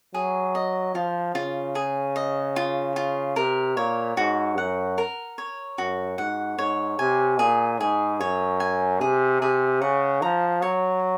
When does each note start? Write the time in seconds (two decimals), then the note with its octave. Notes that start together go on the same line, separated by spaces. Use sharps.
0.14 F#3 G#4
0.55 D#5
0.94 F3 F4
1.35 C#3 F4
1.75 G#4
2.16 D#5
2.56 F4
2.96 F4
3.36 C3 A#4
3.77 A#2 C#5
4.17 G#2 F#4
4.57 F#2 F#5
4.98 A#4
5.38 C#5
5.78 F#2 F#4
6.18 G#2 F#5
6.58 G#2 C#5
6.99 C3 G#5
7.39 A#2 G#4
7.80 G#2 G#4
8.20 F#2 C#5
8.60 G#5
9.01 C3 G#4
9.41 C3 G#4
9.81 C#3 F#5
10.22 F3 A#5
10.62 F#3 C#5